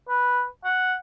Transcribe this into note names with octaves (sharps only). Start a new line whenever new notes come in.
B4
F#5